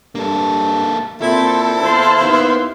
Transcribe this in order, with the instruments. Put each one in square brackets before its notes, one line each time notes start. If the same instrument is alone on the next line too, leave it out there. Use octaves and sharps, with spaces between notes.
[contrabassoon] G2 [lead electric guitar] A#3 A4
[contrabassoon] A#2 [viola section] C4 [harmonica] E4 [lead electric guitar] A4
[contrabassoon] E2 [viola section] C5 F5 C6
[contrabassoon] D#2 [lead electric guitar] B3